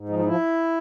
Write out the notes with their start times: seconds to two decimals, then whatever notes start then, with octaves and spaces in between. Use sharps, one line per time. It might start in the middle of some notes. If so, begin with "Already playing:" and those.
Already playing: G#2
0.09 F3 D#4
0.19 D#4
0.24 F3 E4